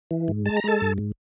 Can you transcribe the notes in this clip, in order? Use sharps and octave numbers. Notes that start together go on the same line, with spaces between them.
E3
G#2
G#3 A5
A#5
G#3 A4 A5
G2
G#2